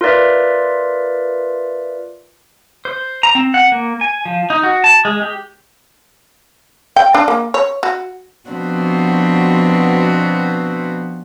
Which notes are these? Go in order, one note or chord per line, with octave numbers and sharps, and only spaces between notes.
F4 A#4 B4 D5 E5
C5
A#5
C4
F#5
A#3
G#5
F3
D#4
F#4
A5
G#3
G4
G5
D4
A#3
C#5
F#4
B2 F3 B3 C4 D4 F#4